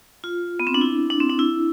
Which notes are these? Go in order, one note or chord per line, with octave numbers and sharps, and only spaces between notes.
F4
B3
C4
D4
E4
D4
C4
D4
E4